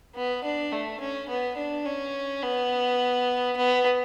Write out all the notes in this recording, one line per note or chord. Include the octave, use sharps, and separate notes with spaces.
B3
D4
A3
C#4
B3
D4
C#4
B3
B3